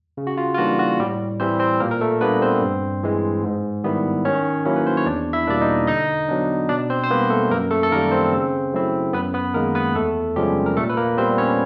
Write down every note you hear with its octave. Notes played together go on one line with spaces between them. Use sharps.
C#3
F#4
F4
F4
E3 G3 A#3 D4 F#4
F#4
A2 G3 G4
E3 G3 C4 C5
C4 C5
A#2 A#3 A#4
A#4
A3 A4
G3 A#3 B3 D4 B4
C4 C5
G2
E3 G#3
G#2
D#3 G3 B3 E4
D#3 C#4 C#5
F#3 A#3 C#4 E4
B4
C5
C#5
E2 D4 D5
E4 E5
B2 G3 A#3 D4 D5
D#4 D#5
D3 D#4 D#5
F#3 B3 D4
B2 D4 D5
C4 C5
C5
G3 A#3 B3 B4
A3 A4
F#2 A#3 A#4
A3 A4
A4
D#3 G3 A#3 A#4
C4 C5
C#3
F#3 A3 C4 E4
F#2 B3 B4
B3 B4
D#3 G#3 A#3 A#4
B3 B4
E2 A3 A4
C3 F3 G3 G#3 C#4 G4
A#4
A#2 A3 A4
B4
A#3 A#4
G3 B3 C4 C5
C#4 C#5